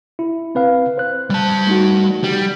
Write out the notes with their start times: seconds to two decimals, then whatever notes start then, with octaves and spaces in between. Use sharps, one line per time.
0.19 E4
0.55 C4 B4 F5
0.98 C5 F#6
1.30 G3 A5
1.67 A3 D#4 F#4
2.24 G3